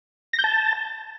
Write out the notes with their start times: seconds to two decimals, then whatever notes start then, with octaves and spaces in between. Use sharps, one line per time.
0.33 A#6
0.39 G6
0.44 A5